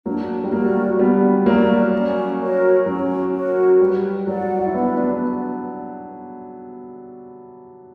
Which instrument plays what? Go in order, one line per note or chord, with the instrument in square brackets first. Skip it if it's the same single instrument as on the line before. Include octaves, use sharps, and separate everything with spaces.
[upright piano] F#3 A#3 [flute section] D4
[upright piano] G3
[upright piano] F#3 A#3 [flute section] F#4 A#4 D5
[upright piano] G3 B3 [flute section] D4
[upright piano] F#3 A#3 [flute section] F#4 A#4 D5
[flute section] C#4
F#4 A#4 C#5
[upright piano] F#3 [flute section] C#4
[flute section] F#4 A#4 C#5
[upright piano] G3 [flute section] B4
[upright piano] F#3 [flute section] D5 F#5
[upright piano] F#4
E4
[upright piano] B3 D4 [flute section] B4
[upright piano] B3 D4